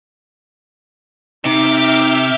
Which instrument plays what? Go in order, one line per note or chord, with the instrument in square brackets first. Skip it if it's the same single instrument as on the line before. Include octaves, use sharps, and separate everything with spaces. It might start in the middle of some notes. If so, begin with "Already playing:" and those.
[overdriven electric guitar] C3 [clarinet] D#4 [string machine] E5 F6 G6 [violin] D6